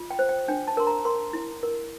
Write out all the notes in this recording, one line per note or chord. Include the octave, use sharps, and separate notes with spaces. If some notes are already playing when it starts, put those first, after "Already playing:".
Already playing: F4
G5
C5
G5
D4 G5
A5
A#4 C6
A#5
A#4 C6
E4
A#4